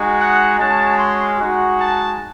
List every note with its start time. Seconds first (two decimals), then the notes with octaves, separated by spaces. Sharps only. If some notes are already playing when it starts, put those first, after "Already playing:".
Already playing: G#3 D#4 F#4
0.20 F#5
0.59 G#3 C#4 F#4 A5
0.98 C6
1.38 G#3 D#4 F#4
1.78 A5